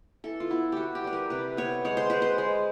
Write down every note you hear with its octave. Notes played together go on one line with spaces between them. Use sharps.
E3 A4
F4
B3 E4
E3 F#4 G4
G4
G3 B4
A#4
C3 B4
B3 C#5
G#3 C#5
C5
G#3 B4
C5
G#3